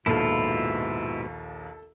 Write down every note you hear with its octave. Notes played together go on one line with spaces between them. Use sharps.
A#1 D#2 G#2 B2 E4 F4 A4